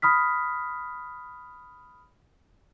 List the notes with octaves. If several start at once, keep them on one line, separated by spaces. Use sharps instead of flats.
B5 D#6 F6 B6